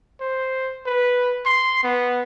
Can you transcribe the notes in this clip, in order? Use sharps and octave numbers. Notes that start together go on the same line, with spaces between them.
C5
B4
C6
B3